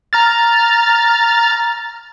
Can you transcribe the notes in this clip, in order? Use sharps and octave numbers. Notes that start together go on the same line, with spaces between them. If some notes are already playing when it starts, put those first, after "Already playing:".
A#5 F6 A6